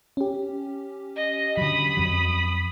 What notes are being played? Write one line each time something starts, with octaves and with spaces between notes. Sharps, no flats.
C#4 G4
D#5
D3 F#3 B5 D#6
F2 F#3